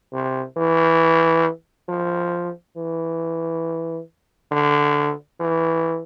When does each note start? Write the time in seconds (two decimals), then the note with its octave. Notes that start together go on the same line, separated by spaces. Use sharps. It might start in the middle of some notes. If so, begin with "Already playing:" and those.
0.13 C3
0.57 E3
1.89 F3
2.77 E3
4.52 D3
5.40 E3